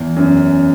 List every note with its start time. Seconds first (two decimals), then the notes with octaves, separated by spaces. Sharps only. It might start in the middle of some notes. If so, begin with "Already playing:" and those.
Already playing: E2
0.16 F#2